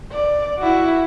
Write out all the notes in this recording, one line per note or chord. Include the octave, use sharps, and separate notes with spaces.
D5
E4 F#4